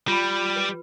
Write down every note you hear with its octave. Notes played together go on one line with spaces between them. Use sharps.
G3 F4 B5
B4